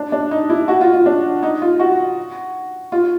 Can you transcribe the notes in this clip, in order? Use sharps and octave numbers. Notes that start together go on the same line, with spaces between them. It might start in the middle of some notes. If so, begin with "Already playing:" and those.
Already playing: D4
D4
D#4
E4
F#4
F4
F4
D4
D#4
F4
F#4
F4